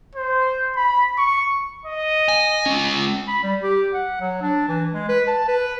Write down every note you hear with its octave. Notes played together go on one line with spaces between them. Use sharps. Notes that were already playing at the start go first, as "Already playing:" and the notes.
C5
B5
C#6
D#5
G#5
G#3 C#4
B5
G3
G4
F#5
F#3
D4
E3
G#3
B4
A5
B4